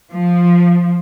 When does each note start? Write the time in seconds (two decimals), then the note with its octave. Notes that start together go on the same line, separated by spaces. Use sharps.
0.13 F3